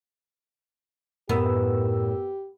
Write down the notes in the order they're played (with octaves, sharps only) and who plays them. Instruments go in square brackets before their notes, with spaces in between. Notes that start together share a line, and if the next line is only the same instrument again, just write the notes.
[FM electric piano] F#2 A#4 E6 [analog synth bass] A2 [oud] B3 [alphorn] G4